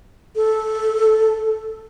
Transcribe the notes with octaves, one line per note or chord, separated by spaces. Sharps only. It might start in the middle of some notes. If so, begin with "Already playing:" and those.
A4